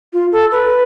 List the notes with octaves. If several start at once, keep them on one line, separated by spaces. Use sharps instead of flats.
F4
A4
B4